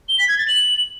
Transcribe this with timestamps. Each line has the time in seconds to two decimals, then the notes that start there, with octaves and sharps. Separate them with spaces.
0.09 G7
0.18 B6
0.28 G#6
0.38 A6
0.48 F#7